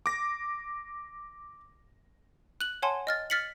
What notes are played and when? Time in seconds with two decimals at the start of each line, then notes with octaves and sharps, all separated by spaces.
0.06 D6 A#6
2.61 F#6 F#7
2.82 C#5 F#5 G#5 A5 C6
3.07 D#5 F6 A6
3.30 F6 A6 B6 C#7 F#7